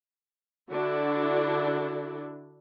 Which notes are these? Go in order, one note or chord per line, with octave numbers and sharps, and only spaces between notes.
D3 D4 E4 F#4